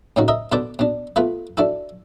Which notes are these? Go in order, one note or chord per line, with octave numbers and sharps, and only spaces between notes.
A2 C#3 C4 D#4 F#4
A#4 D#5 E5
B2 D3 B4 C5 A5 D6
B2 D4
A3 B3 F4 B4
D4 E4 F#4 A4